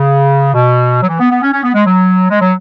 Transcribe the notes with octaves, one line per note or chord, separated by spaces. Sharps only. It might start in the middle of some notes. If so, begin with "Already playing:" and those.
Already playing: C#3
B2
F#3
E3
B3
B3
C#4
C#4
B3
G#3
F#3
G#3
F#3